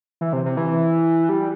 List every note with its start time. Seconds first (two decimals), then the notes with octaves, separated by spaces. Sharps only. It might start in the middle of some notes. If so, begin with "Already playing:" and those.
0.21 E3
0.33 C3
0.46 C3
0.57 E3
1.29 G3